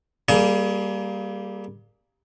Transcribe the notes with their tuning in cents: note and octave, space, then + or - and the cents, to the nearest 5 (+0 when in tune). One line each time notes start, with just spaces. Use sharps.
G3 +0 A#3 +0 G#4 +30